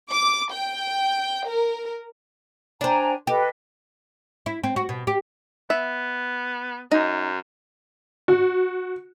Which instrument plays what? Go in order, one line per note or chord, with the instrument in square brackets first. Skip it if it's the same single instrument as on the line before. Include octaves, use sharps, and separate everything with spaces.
[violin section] D6
G5
A#4
[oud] D4 C5 [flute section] G5 G#5 A#5
[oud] G4 [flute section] A4 B4 D#5
[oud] E4
C4
F#4
B2
G4
[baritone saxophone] B3 [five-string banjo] E5
[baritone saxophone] F#2 [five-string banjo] D#4
[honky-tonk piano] F#4